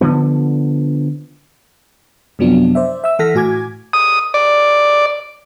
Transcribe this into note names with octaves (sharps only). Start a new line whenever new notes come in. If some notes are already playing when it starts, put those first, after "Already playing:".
D3 F3 B3
F#2 C3 F3 F#3 B3 D4
C5 D5 E5
E5 E6
E3 A4 F#5 F6 A#6 B6
A2 F#4 G#5 D6 G#6
D#6
D5